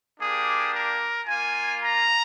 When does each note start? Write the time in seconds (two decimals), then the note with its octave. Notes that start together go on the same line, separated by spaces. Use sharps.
0.19 A#3 D4 G4 G#4
0.72 A#4
1.27 A#3 F4 G#5
1.80 A#5